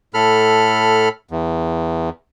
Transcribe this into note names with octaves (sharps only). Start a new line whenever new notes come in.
A2 A4 B5 F6
E2